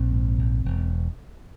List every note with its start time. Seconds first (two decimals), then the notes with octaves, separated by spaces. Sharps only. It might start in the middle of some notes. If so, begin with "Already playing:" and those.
Already playing: A#1 C4
0.12 G#2
0.38 A#1
0.65 E1